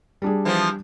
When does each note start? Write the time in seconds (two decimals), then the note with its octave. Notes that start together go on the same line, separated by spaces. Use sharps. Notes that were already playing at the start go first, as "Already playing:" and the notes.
0.22 G3 D4 G#4
0.45 E3 F3 B3